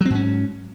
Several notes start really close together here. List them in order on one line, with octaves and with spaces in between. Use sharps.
F#3 C4 G#2 C#4